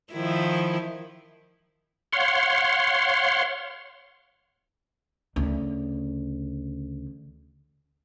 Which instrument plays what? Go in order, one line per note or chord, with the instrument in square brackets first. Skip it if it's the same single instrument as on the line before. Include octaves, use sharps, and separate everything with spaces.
[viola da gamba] D#3 F3 E4
[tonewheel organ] C#5 F5 F#5 C6
[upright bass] D2 C#3